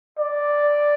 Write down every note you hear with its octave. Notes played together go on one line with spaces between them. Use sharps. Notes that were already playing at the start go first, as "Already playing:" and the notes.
D5